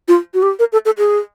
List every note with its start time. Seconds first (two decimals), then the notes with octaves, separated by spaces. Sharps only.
0.08 F4
0.34 F#4
0.43 G4
0.59 A#4
0.73 A4
0.85 A4
0.98 G#4